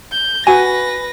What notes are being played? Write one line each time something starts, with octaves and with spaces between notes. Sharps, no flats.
G6
F#4 B4 G#5 A#6